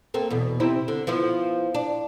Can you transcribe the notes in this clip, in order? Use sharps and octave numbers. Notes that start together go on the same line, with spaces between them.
A3 A#3 C4
E2 B2
C3 C4 E4
D3
F3 B3 E4
D4